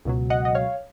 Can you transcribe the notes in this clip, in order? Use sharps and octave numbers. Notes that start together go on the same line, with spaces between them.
C#2 B2 F#3
D#5 F#5
D#5
C#5 F5